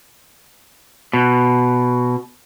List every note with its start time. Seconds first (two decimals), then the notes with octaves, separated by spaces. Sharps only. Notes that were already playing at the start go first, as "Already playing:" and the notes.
1.13 B2